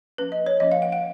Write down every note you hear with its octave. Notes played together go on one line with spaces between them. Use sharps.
F3 A#3 C#4 B4
D#5
C#5
F3 A#3 C#4 D#5
F5
F#5
F#5